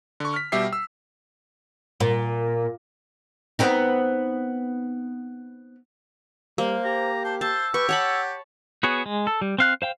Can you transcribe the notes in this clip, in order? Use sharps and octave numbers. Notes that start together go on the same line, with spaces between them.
D3 C#6
F6 B6
B2 G3 G4 E5 G5 C7
E6
A#2
B3 C4 D#4
G3 A#3 C5
G4 A#5
C5 A5
C5 A5 E6
G4 B4 C#6
C#5 F#5 A5 B5
B3 F#4 G#4 C#5
G#3
A4
G3
C4 F5 F#6
C5 F5 G5